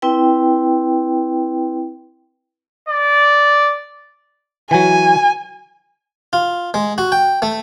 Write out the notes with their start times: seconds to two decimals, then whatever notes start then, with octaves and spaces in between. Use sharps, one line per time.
0.02 C4 E4 B4 G5
2.89 D5
4.71 E3 F#3 G#5
6.33 F4
6.74 G#3
6.98 F#4
7.12 G5
7.42 A3